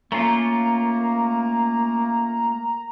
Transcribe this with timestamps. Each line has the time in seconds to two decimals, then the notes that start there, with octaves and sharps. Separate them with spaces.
0.12 A3 A#3 C#4 F4 A#5